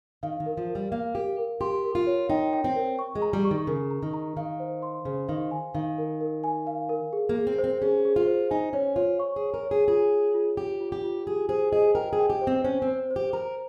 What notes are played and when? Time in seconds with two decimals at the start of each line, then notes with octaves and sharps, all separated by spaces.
0.23 D#3 F5
0.40 D#3
0.46 A#4
0.57 F3
0.69 A#4
0.75 G3
0.92 A#3 F5
1.15 G4 A#4
1.38 A#4
1.61 G4 C6
1.84 A#4
1.95 F4
2.07 C#5
2.30 D#4 G5
2.53 G5
2.64 C4
2.76 A#4
2.99 C#6
3.15 G#3
3.22 A#5
3.33 G3
3.45 C#6
3.51 D#3
3.67 C#3 A#4
3.91 A#5
4.03 D#3
4.14 A#5
4.37 D#3 F5
4.60 C5
4.82 C6
5.05 C#3 C5
5.28 D#3 F5
5.51 G#5
5.74 D#3 F5
5.98 A#4
6.21 A#4
6.44 G#5
6.67 F5
6.89 A#4
7.13 G#4
7.29 A#3
7.36 G#4
7.47 C4
7.59 C5
7.64 C4
7.82 C#4 G#4
8.05 G#4
8.16 F4
8.27 C5
8.51 D#4 G#5
8.73 C#4 C#5
8.96 F4 C#5
9.20 C#6
9.36 G#4
9.42 C#5
9.54 A#4
9.65 C#5
9.71 G#4
9.88 F4 G#4
10.12 F4
10.34 F4
10.57 F4 G4
10.80 F4
10.92 G4
11.04 F4
11.26 G4 G#4
11.49 G#4 C5
11.72 G#4 D#5
11.95 A#4 G5
12.13 G#4
12.19 G5
12.30 G4
12.41 C5
12.47 C4
12.64 C#4 C5
12.82 C4
12.87 C5
13.11 C5
13.16 G4
13.33 A#4 A#5